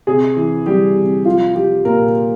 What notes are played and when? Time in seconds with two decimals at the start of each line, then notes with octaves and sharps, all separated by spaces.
0.07 C3 G#4
0.37 E3
0.66 G3 G4
0.95 C3
1.25 F3 F4
1.55 F3 G4
1.85 A#2 A#4